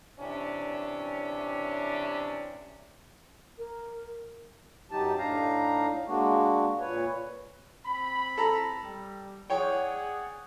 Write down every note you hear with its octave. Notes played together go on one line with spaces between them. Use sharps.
C3 E3 C#4 D4
A#4
F#2 F#3 D#4 G4 A5
A2 D4 D#4 F5 A#5
G#3 A#3 D4 F#4
A#2 B4 C#5
C4 B5
A4 A#5
G3
G#4 C#5 D5 F#5 G5